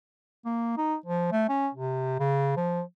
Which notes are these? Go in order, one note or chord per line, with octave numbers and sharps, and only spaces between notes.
A#3
D#4
F3
A3
C#4
C3
C#3
F3